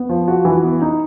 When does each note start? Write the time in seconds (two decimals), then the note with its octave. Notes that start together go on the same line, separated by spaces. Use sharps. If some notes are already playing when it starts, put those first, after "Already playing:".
Already playing: B3
0.09 F3
0.28 F#4
0.45 E3
0.63 B3
0.82 D#4